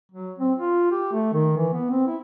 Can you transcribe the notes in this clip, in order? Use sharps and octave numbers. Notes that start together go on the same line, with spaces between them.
F#3
C4
F4
G4
A3
D#3
E3
B3
C4
E4